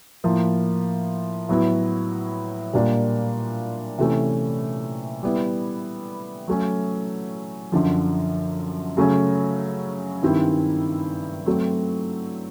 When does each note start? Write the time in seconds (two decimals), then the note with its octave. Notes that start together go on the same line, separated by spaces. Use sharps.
0.24 A2 F3 A#3
1.49 A2 F#3 B3 E4
2.73 A#2 G3 A#3 D4 F4
3.98 C3 E3 A3 C#4
5.23 G3 B3 E4
6.48 F#3 A3 C#4
7.72 F#2 D3 F3
8.97 C#3 F#3 A3 C#4
10.22 G2 D#3 G3 C4 E4
11.46 F#3 A3 C4